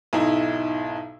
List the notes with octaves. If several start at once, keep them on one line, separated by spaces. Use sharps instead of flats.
B1 G#2 D#4 E4